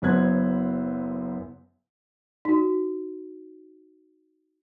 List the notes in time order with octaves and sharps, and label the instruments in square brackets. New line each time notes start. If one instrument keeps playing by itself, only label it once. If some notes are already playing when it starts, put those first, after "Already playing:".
[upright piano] F#1 F#2 B3 C5 F#6 G#6
[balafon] D#4 F#4